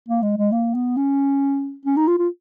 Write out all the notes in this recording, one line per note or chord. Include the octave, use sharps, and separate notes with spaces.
A#3
G#3
G#3
A#3
B3
C#4
C#4
D#4
F4
F4